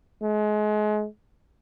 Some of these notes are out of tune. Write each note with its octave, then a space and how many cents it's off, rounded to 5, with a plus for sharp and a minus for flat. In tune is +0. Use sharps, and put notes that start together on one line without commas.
G#3 +30